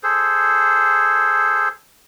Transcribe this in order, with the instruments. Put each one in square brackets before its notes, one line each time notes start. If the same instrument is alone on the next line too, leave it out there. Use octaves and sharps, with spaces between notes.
[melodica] G#4 A4 C5